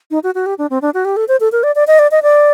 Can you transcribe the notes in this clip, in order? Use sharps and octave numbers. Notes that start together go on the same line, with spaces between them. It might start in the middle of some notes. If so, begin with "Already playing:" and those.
D#4
F#4
F#4
G4
D4
C4
D4
F#4
G4
A4
C5
A4
A#4
D5
D5
D#5
D5
D#5
D5